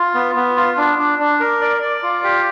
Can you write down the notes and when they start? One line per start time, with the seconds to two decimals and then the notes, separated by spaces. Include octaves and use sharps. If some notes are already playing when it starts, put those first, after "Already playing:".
Already playing: F4
0.14 B3
0.36 B3
0.56 F4
0.77 D4
0.98 D4
1.19 D4
1.40 A#4
1.61 D5
1.82 D5
2.03 F4
2.24 G4